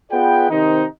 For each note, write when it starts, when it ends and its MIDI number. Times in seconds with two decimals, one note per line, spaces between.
0.11 0.48 59
0.11 0.48 65
0.11 0.48 68
0.11 0.48 71
0.11 0.48 74
0.11 0.48 79
0.50 0.84 48
0.50 0.84 51
0.50 0.84 60
0.50 0.84 63